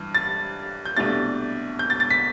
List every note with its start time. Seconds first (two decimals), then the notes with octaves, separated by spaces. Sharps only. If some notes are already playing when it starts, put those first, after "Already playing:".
Already playing: G2 E3
0.15 A6
0.85 G6
0.97 C2 B2 A3 D4 A6
1.79 G6
1.90 A6
2.00 A6
2.10 B6